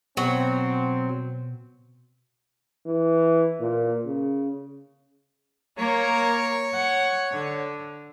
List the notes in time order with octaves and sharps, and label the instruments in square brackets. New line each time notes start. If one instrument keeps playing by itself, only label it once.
[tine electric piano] B2 [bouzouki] F#3 [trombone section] C4
[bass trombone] E3
A#2
C#3
[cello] A#3 A#4 [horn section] C#5
[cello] F#5
D3